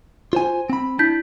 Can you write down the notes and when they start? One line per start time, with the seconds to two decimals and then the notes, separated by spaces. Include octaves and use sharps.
0.33 F4 C5 G#5
0.70 C4 B5
0.99 D4 E4 G6 B6